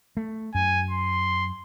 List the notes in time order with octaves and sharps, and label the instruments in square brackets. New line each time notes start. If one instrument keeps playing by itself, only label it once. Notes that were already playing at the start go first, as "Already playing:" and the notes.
[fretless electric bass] A3
[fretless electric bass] F#2 [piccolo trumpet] G#5
[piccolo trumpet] C6